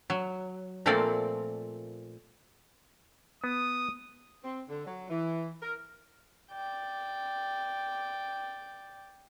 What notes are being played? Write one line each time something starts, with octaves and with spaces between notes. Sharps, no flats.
F#3
A#2 F3 A3 A#3 C4 D5
B3 D#6
C4
D3
F#3
E3
A#4
D5 G5